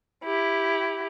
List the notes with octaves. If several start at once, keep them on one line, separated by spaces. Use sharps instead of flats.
E4 G4